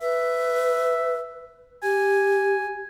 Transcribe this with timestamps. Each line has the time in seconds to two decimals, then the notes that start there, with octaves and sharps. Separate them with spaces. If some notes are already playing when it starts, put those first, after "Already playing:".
0.02 B4 E5
1.83 G4 G#5